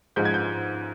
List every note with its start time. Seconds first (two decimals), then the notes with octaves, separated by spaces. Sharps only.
0.16 G#2 F3 G#3 G6
0.25 G#6
0.34 G6